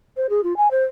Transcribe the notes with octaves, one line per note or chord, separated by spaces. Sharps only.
C5
G#4
F4
G#5
C5